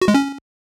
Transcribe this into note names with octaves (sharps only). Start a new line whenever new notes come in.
F#4
G#3
C#4